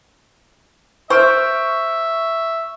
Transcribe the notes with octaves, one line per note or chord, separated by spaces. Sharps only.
C5 E5 C#6 F6 D7